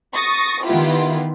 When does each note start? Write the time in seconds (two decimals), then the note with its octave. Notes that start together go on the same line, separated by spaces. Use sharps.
0.14 C#6 D#6 A6 A#6
0.64 D#3 B3 E4 F4 G4